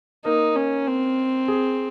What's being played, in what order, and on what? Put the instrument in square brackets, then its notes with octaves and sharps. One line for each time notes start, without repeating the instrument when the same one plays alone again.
[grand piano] A#3 A#4 [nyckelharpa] D#4
[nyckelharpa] C#4
C4
[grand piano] G#4